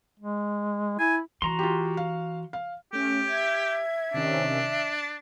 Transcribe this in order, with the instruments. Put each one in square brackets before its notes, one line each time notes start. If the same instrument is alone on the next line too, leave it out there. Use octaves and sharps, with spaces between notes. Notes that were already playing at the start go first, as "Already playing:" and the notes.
[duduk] G#3
[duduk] E4 [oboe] G#5
[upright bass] E3 [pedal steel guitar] F#4 A#5 C6
[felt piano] F4 G4
F5
F5
[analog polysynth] A3 C#4 [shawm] G4
[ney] E5 [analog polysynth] G#6
[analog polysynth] C3 D#3 C#4 [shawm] D4
[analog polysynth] A6